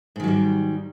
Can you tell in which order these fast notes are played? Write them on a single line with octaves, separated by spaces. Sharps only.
G#2 D#3 F#3 G3